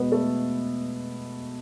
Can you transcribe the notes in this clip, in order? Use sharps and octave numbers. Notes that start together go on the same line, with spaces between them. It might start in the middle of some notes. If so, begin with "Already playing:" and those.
Already playing: B2 G#3 B3 B4
A3 A4